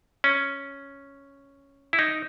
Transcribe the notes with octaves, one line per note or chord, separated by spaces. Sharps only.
C#4
E4
D#4